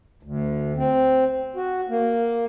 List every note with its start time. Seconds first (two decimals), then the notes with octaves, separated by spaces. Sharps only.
0.23 D2
0.77 C4
1.56 F#4
1.89 A#3